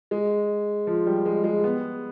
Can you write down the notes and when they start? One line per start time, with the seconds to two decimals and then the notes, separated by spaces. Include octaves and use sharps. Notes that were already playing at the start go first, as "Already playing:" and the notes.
0.11 G#3
0.87 F3
1.07 G3
1.25 G#3
1.44 G#3
1.64 B3